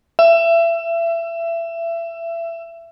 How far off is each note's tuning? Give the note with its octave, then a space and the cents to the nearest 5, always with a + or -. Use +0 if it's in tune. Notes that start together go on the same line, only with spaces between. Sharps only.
E5 +25